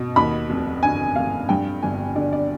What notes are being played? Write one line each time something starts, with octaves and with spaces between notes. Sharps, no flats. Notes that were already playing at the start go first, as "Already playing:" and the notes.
Already playing: B2
D#2 B5
F1
D3 G#5
F1 F5
G2 G5
G1 G#5
D3 D5
D5